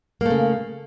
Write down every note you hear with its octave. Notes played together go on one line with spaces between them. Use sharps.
C#3 A3 A#3